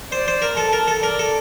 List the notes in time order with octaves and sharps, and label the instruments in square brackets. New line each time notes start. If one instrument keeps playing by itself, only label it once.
[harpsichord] C5 [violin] D5
[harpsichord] C5
A#4
[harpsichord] A4 [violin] A5
[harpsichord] A#4
A4
[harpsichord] A#4 [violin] D5
[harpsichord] A4